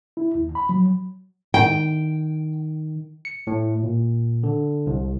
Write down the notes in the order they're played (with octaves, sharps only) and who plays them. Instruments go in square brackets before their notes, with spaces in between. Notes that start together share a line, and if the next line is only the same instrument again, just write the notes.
[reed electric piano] E4
D#2
B5
F#3
[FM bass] D#3 [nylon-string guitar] G5
[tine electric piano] C#7
A2
A#2
D3
C2